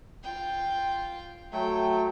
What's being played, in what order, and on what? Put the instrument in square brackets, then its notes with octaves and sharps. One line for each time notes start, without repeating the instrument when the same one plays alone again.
[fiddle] F4 G5
[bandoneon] F#3 A3 [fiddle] G5